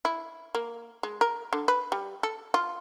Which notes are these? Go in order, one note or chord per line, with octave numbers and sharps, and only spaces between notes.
E4
A#3
G#3
A#4
D3
B4
G3
A4
F4